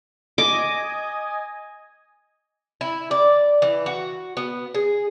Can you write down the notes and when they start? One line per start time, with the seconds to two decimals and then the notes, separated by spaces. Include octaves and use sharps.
0.38 D#5 G#5 D6
2.81 E4
3.11 D5
3.62 E3
3.86 F#4
4.37 B3
4.74 G#4